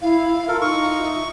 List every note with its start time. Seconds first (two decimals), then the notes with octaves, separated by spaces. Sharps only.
0.02 E4 F5
0.48 F4 A4 A#4
0.61 D#4 C#6
1.00 E5